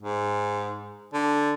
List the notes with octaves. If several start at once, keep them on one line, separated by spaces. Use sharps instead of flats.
G#2
D3